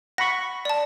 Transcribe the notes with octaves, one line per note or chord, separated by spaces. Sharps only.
F#5 B5 C#6 A#6
D5 A5